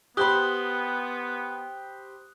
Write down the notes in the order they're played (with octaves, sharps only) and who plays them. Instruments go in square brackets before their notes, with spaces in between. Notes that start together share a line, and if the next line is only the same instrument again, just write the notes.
[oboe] B3 [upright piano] G4 C5 B5 [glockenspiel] D#6 F#6 G7